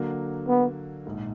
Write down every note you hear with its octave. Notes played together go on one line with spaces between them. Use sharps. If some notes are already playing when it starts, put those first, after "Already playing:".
Already playing: D3 F#3 A#3
B3
A#1 G#2 D#3